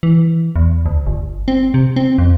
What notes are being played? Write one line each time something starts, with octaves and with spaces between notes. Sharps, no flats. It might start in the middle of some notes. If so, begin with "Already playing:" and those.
E3
E2
D2
G1
C4
C3
C4
F2